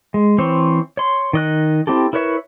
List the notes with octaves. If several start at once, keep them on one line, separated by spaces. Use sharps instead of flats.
G#3
E3 C4 C5 C#5
C#5 C6
D#3 D#5 F#6
C4 E4 G4 A4
E4 A#4 B4 C#5 E5